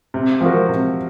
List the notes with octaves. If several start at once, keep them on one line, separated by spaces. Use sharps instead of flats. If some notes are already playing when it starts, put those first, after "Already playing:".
C3
F3 C4 F#4 A#4
C3